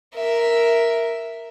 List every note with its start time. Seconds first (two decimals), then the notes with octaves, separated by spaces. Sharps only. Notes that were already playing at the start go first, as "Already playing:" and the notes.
0.16 A#4 E5